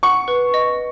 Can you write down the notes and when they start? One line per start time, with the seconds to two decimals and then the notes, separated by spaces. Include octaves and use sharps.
0.03 F#5 C#6
0.28 B4
0.54 D#5